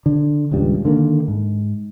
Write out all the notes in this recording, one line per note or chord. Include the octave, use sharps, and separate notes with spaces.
D3
D#1 C#2 G2 G3
D3 D#3 A#3
G#2